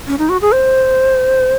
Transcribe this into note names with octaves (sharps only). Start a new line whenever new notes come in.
C#4
D#4
F#4
G#4
C5